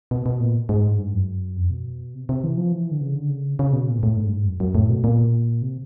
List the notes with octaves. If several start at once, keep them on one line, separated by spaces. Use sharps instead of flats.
B2
B2
A#2
G#2
G2
F#2
F2
B2
C3
C3
E3
F3
E3
D3
C#3
D3
C#3
C#3
B2
A#2
G#2
A2
G#2
G2
G#2
F#2
F#2
A2
B2
A#2
C3